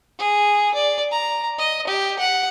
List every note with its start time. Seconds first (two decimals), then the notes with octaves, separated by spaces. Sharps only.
0.19 G#4
0.74 D5
1.11 A#5
1.58 D#5
1.87 G4
2.19 F#5